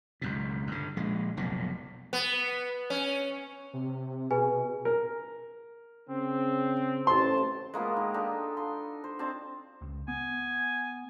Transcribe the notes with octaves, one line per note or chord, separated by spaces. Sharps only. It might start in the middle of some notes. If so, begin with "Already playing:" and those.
C#2 F#2 B2
G2 D3
A#1 G#3
F1 B1 A#2
B3
C#4
C3
B2 G#4 B4 G#5
A#4
C#3 C4
A1 C5 A5 C6
G#3 A#3 B3 F4
D#3
D4 D#4 G4 A4
C6
C5
C4 D4 D#5 A5
C#2
B3 G#5